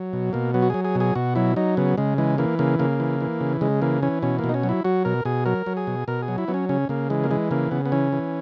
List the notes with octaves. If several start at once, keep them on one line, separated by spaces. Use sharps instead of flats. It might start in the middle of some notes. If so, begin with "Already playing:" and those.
Already playing: F#3
B2
B2 A#3
F#3 B3
F#4
F#3 G#4
G#4
B2
G#4
B2 F#4
F#3 E4
F#3 D#4
C#3 B3
C#3 G#3
E3 G#3
E3 A#3
C#3 A#3
C#3 A#3
E3
E3
C#3
C#3 G#3
E3 A#3
E3 C#4
B2 C#4
A#3
B2
D#4
C#4
F#3
E4
F#3 F#4
B2 A#4
B2 G#4
F#3 A#4
F#3
G#4
B2
B2 A#4
G#4
F#3
E4
F#3 B3
C#4
C#3 C#4
C#3 A#3
E3 G#3
A#3
E3 G#3
C#3 A#3
C#3 B3
B3
E3 C#4
E3